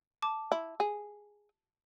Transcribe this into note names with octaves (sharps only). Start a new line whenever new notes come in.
A5 D6
E4
G#4